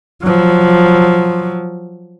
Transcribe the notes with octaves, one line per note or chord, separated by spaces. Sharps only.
F3 F#3